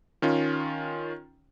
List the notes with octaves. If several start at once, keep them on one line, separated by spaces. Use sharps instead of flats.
D#3 C#4 F4